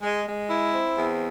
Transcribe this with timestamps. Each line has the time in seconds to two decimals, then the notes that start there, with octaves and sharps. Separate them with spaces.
0.01 G#3
0.25 G#3
0.48 E4
0.72 C4
0.95 E2